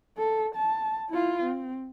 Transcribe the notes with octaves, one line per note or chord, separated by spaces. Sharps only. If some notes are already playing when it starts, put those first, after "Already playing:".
A4
A5
E4 F4
C4